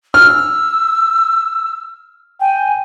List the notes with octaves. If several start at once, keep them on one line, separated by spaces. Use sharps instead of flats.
E6 F6
G5 G#5